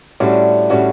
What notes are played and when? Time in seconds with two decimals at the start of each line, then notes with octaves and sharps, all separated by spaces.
0.20 A2 D3 G3 C#4 F#4
0.70 A2 G3 C#4 F#4